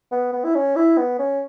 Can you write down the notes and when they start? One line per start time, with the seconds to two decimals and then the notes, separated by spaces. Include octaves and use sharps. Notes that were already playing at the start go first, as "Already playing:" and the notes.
0.12 B3
0.33 B3
0.44 E4
0.55 C#4
0.76 E4
0.98 B3
1.19 C#4